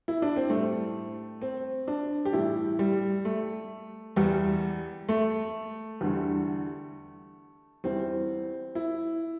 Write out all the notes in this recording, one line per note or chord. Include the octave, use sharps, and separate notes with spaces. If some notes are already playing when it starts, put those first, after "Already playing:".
E4
D4
C4
A2 G3 A3
C4
D4
G4
A2 E3 G3 E4
G3
A3
E2 E3 G3
A3
E2 D3 G3
E2 E3 G3 C4
E4